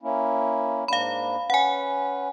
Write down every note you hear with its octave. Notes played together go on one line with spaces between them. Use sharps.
A#3 C#4 E4
G#2 A#3 D4 F5 B5
C#4 B4 F#5 G#5